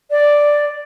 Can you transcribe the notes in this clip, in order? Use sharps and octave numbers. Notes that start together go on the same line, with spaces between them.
D5